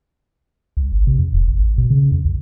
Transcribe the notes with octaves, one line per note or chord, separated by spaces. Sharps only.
C2
G1
C3
F2
E1
A1
A1
B2
C#3
F2
B1